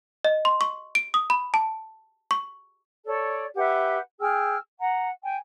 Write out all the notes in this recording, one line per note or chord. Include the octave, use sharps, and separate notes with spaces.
D#5
C6
C#6
D7
D#6
B5
A5
C#6
A4 C#5 D5
G4 B4 E5 F#5
G#4 G5 E6 F6
F#5 A#5
G5 G#5